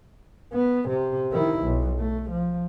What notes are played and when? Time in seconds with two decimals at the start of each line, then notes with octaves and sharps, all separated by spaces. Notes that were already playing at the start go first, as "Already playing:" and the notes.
0.53 B3
0.89 C3
1.32 D#3 E4
1.63 B1
1.99 A3
2.31 F3